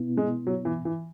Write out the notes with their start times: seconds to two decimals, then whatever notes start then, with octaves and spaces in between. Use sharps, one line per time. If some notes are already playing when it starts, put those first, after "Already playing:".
Already playing: B2 B3 E4
0.17 G#3
0.47 F#3
0.65 E3
0.85 E3